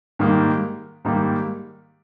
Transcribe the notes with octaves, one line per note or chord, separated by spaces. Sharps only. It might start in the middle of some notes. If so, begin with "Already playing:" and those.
G#2 D#3 G3 A#3
G#2 D#3 G3 A#3